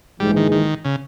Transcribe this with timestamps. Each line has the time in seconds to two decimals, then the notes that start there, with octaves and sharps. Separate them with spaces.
0.20 A#1 G#2 E3 G3 G#3
0.36 D#3
0.52 D#3
0.85 C#3